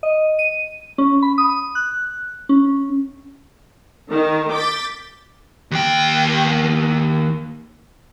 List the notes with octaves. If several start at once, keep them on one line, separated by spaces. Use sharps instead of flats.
D#5
D#7
C#4
B5
D#6
F#6
C#4
D#3
D6 G6 A6 B6
D#2 G5